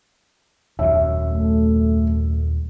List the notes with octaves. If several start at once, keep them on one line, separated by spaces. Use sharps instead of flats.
D#1 F#2 E5
A3